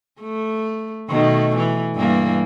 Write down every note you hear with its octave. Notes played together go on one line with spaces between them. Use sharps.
A3
B2 D#3 A3
E3
G2 E3 A#3